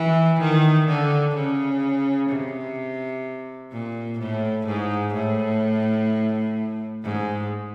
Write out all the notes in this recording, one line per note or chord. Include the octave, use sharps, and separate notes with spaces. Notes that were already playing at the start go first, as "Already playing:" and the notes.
Already playing: E3
D#3
D3
C#3
C3
A#2
A2
G#2
A2
G#2